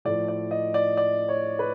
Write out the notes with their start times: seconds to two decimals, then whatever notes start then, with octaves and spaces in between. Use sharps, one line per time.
0.05 A2 F3 A3 D5
0.28 D5
0.51 D#5
0.74 D5
0.97 D5
1.29 C#5
1.59 B4